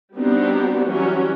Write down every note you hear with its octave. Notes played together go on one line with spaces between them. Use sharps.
G3 B3 C4 D4 D#4 F#4
E3 F#3 G3 C#4 F#4